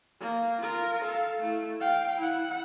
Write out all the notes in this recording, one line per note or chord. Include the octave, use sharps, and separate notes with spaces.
A#3
F4 A#4
A4 F5
A3 E4
F5 G5
E4 F#5